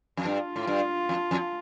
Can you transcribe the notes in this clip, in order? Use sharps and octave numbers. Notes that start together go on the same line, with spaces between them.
F2
G2 F4
A2
G2
F2
F2